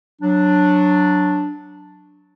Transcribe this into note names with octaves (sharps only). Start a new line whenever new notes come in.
F#3 D4